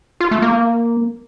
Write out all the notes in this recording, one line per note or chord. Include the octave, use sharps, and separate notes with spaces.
F4
A3
A#3